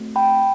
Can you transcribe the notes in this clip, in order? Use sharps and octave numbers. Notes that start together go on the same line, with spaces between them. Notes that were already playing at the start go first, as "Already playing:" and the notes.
Already playing: A3 C4 F#4
G5 B5